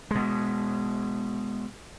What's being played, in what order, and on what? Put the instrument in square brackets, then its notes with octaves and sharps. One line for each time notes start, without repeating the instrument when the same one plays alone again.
[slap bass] B2 G#3